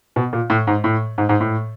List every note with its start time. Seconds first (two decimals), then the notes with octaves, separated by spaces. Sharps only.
0.16 B2
0.33 A#2
0.50 A2
0.67 G#2
0.84 A2
1.18 G#2
1.29 G#2
1.41 A2